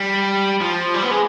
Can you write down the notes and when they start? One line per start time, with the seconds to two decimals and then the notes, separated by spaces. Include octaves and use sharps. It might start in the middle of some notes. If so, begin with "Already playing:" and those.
Already playing: G3
0.61 F3
0.94 G3
1.03 B3
1.11 G#3